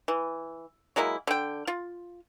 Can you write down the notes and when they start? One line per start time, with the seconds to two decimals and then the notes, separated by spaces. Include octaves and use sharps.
0.08 E3
0.96 F#3 G#3 A#3 E4
1.27 D3 G5
1.67 F4